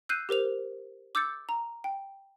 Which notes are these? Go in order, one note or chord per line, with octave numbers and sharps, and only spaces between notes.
E6 F#6 G6 C7 D#7
G4 A#4 C5 F7
D6 E6 G6 A6 C#7
A#5
G5